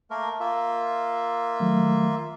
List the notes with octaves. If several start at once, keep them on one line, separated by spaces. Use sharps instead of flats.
A3 A#3 A#4
A#3 F4 E5
D#3 F#3 A3